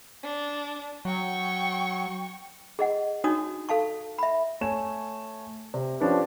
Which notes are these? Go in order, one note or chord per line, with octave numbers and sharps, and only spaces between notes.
D4
F#3 G5 C#6
G#4 D#5 F#5
D4 D#4 F#4 C#5 D#6
A4 F5 A5 C#6
E5 B5
A3 C#5 G#5 E7
C3
F3 C#4 D4 G4 B4